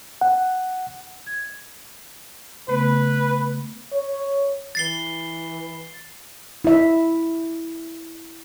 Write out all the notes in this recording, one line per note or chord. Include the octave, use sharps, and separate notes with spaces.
F#5
G#6
C#3 A3 B3 B4
C#5
E3 A6 C7 G7
E4 E5